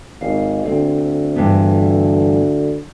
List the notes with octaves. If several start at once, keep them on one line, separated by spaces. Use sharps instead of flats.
G#1 F5
D2 C4
G2 E3 B3